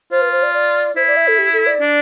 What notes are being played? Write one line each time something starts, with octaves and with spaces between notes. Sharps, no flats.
F4 C5
B4
C5
D5
D5
E4 C5
D5
E5
A4
G4
A4
D5
D4